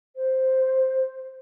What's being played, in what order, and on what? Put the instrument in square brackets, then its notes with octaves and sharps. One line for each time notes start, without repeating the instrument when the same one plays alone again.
[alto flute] C5